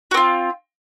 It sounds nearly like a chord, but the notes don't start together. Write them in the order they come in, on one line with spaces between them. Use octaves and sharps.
F#4 C4 F4